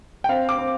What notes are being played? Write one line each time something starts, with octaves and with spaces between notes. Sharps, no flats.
G5
C4 F5
D6
C4